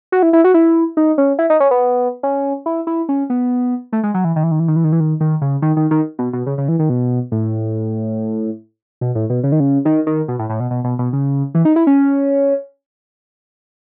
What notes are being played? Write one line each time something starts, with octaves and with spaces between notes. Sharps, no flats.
F#4
E4
E4
F#4
E4
D#4
C#4
E4
D#4
C#4
B3
C#4
E4
E4
C#4
B3
A3
G#3
F#3
E3
D#3
E3
D#3
E3
D#3
E3
D#3
E3
D#3
D#3
C#3
D#3
D#3
D#3
B2
B2
C#3
C#3
E3
D#3
B2
A2
B2
A2
B2
C#3
D#3
C#3
D#3
D#3
B2
A2
A2
B2
B2
B2
B2
C#3
E3
D#4
E4
C#4